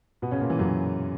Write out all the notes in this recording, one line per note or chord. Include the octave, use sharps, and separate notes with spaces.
B2 B3
C#3 C#4
A#2 A#3
E3
F#2 F#3